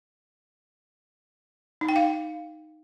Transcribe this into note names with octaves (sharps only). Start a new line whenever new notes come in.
D#4
G5
F5